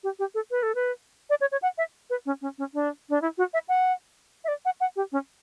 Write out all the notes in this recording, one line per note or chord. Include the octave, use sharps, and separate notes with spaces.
G4
G4
A4
B4
A4
B4
D5
C#5
C#5
F#5
E5
B4
C#4
C#4
C#4
D4
D4
E4
F#4
E5
F#5
E5
D5
F#5
F#5
G4
C#4